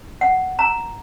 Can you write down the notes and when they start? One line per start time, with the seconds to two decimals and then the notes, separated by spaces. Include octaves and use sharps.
0.21 F#5
0.59 A#5